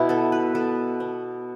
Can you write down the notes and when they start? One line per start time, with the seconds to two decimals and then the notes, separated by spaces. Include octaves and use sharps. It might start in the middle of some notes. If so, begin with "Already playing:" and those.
Already playing: B2 E4
0.09 B3 A4
0.32 B4
0.55 B3 A4
1.00 B3